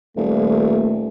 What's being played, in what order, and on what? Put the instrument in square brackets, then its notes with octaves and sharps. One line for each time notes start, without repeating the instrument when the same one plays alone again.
[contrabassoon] D#1 [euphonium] A3